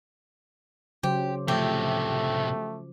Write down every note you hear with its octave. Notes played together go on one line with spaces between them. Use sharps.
C#3 F#3 G4 C5
A2 C3 F3 A3 G4